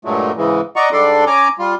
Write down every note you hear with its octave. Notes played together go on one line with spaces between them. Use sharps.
G2 A#2 F#3 G#3 A3
G#2 C#3 E3 G#3
D5 D#5 F#5 A#5 C#6
G#2 G3 D4 A4 D5 C6
C#4 G#5 A#5 D6
G3 F4